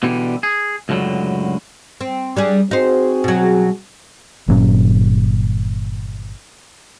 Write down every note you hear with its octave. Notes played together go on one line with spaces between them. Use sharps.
B2 D3 E3 G3
G#4
C#2 F#2 A2 D3 F#3
C4
G3 D4 G#4
C4 D#4 F#4 G#4 C5
B2 F#3
G1 A#2 F#3 C#4